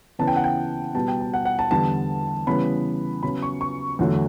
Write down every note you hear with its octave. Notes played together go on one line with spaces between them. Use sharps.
C#3 E3 B3 A5
G5
F#5
G5
B2 G3 B3 A5
G5
A5
F#5
F#5
A5
E2 D3 G3 B3 A5
C#3 E3 G3 B3 B5
C#3 F#3 B3 B5
C#6
C#6
E2 D3 F#3 A3